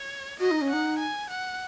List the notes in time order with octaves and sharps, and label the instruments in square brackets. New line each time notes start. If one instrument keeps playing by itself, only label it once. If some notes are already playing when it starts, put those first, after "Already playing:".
Already playing: [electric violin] C#5
[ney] F#4 [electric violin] D#5
[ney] D#4
C#4
[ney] D#4 [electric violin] F#5
[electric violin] G#5
F#5